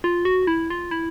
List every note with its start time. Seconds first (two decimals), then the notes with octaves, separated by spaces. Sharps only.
0.04 F4
0.25 F#4
0.47 E4
0.70 F4
0.91 E4